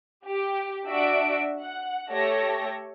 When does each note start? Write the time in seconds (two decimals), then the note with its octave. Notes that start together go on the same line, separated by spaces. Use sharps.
0.28 G4
0.88 D4 F#4 D5 E5 D7
1.62 F#5
2.11 A3 G4 A4 C#5 A#6